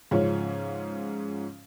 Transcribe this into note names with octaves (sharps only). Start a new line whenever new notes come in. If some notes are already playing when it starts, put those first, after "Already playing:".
G#2 C#3 F3 C#4